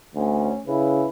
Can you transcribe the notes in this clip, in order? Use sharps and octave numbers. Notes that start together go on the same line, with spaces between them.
D2 A3 C#4
C#3 E4 B4